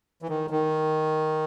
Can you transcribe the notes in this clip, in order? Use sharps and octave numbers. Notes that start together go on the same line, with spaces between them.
E3
D#3
D#3